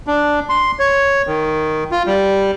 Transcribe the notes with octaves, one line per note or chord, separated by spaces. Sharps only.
D4
C6
C#5
D#3
F4
G3